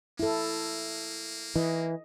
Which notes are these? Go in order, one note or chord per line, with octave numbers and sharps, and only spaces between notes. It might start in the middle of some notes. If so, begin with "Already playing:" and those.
A#3 E4 A4
E3 D#5